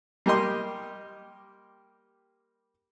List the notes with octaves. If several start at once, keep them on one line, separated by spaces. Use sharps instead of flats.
G3 A#3 G4 D#5 C6